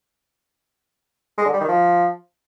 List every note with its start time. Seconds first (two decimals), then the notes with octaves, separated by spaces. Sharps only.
1.38 G#3
1.46 D3
1.53 G3
1.61 D#3
1.69 F3